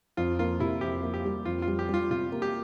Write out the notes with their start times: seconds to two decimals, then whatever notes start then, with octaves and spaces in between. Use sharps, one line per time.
0.17 F2 F4
0.39 A#3 F4
0.60 C3 E4
0.81 F2 G4
1.03 A#3
1.14 G4
1.25 G3
1.45 F2 F4
1.62 F4
1.68 G3
1.79 G4
1.89 G3 F4
2.10 C3 F4
2.32 A#3
2.42 G4